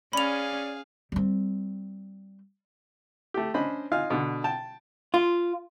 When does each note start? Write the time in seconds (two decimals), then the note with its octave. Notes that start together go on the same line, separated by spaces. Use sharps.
0.13 C#4 G#4 D5 F5 B5 F7
1.12 G3 C4
3.34 A3 G4
3.54 C#4 D4 C5 D#5 B5
3.92 D#4 F4 F5 G#5
4.10 B2 D3
4.44 G5 A5
5.14 F4